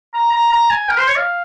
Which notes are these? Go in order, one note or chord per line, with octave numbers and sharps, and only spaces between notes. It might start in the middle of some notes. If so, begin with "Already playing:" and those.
A#5
A#5
A#5
G#5
A#4
C5
C#5
F5